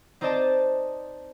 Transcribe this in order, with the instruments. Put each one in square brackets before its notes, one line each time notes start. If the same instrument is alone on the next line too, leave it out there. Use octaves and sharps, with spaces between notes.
[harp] C4 D#4 C5 D5 D#5 A5